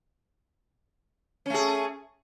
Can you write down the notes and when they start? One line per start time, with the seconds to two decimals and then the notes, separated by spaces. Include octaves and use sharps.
1.46 C#4
1.50 A3
1.54 G#4